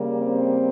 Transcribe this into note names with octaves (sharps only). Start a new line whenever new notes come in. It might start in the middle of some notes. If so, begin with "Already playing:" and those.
Already playing: C#3 G3 A#3
C4